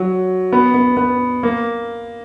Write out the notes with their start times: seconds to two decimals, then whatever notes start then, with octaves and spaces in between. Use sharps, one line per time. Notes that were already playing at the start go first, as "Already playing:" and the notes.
Already playing: F#3
0.52 B3
0.74 B3
0.97 B3
1.43 A#3